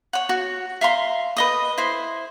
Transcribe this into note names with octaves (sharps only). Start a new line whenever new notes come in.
C#5 F#5
F#4
E5 F5 A#5 C6
B4 D#5 D#6
E4 C5